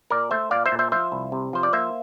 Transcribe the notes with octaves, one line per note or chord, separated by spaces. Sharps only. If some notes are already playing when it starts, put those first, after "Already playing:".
A#2 A#4 D5
A3 C5 E5
A#2 D5 F5
C5 E5
A#2
C5 E5
F3 C5 E5
C2
C3
F3 C5
D5
A#3 C5 E5